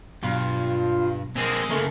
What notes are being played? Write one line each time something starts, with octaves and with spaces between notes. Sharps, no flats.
G2 B2 F#3 F4
G#3 A#3 C4 G#4 E6
C#3 A3 A#3